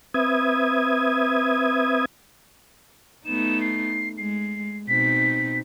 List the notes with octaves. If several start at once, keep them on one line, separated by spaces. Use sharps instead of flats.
C4 B4 E5 D#6 G#6
A3 B3 D#4 E7
C7
G#3 C7
B2 C4 D#4 B6